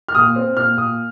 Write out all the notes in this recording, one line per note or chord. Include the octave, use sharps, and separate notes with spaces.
F6
A#2 D#6
C4
A#2 F6
A#2 D#6